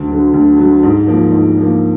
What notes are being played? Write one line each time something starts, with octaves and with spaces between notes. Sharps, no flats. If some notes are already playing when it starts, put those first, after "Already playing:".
Already playing: D2
D3 F#3
D2
D3 F#3
G#2
F3 A#3
G#2
F3 A#3